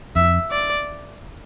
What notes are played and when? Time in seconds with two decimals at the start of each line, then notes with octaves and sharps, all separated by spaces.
0.16 F2 E5
0.51 D5